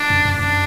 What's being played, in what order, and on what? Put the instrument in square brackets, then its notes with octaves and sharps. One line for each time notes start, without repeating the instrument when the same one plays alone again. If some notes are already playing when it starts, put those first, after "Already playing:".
Already playing: [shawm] D4
[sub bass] F#2
F#2
[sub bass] F#2 [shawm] D4